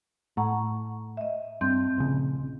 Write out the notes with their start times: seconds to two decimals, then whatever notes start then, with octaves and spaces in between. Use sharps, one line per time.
0.37 A2 F#5 A#5 C#6
1.17 D#5 E5
1.61 G2 C4 C6 G6
1.98 A#1 C#3